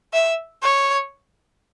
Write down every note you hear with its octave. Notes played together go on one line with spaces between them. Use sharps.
E5
C#5